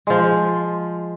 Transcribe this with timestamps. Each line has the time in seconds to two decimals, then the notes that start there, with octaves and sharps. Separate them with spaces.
0.07 F3 G#3